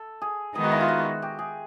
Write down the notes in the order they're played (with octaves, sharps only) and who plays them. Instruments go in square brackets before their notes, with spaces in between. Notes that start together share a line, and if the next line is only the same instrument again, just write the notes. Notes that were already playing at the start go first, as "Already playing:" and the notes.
Already playing: [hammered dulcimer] A4
G#4
[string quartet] D#3 G#3 B3 D#4 [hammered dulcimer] G#4
[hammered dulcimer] F#4
E4
F4
F#4
G4
G#4